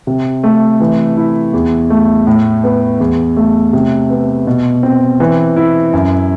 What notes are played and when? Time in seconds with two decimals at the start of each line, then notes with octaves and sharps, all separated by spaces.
0.07 C3
0.44 A3
0.80 E3
1.17 E4
1.53 E2
1.90 A3
2.27 A2
2.64 B3
3.00 E2
3.37 A3
3.73 C3
4.10 B3
4.47 B2
4.83 C4
5.20 E3
5.56 E4
5.93 F#2